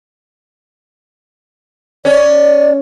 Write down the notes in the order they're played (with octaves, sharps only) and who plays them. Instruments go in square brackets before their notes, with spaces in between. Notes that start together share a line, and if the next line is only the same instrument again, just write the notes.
[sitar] C#4 [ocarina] D5